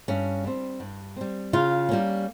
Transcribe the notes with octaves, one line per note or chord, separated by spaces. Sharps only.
G2 C#4
G3 C4
G2
G3 C4
C#3 F4
G3 A#3 C#4